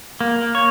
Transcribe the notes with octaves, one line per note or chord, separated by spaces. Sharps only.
A#3
C#5